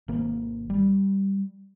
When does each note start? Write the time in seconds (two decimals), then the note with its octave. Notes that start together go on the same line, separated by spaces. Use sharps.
0.08 G#1 A#3
0.70 G3